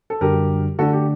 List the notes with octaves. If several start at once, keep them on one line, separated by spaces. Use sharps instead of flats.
A4
F#2 D3 G3 D4 F#4 G4 A#4
D3 A3 D4 F#4 A4
G4